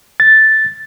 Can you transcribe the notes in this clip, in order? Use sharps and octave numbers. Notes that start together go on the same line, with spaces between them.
A6